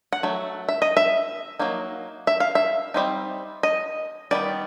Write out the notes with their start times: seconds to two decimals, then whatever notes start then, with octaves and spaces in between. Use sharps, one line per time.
0.13 F#5
0.23 F#3 A3
0.69 E5
0.82 D#5
0.97 E5
1.59 F#3 A#3 D#4
2.27 E5
2.40 F5
2.55 E5
2.94 G3 C4 D#4
3.63 D#5
4.31 D#3 G3 B3 D5